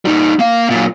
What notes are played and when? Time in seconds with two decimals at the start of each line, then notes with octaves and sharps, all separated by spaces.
0.05 G3 D#4
0.39 A#3 F5
0.70 F#2 A#2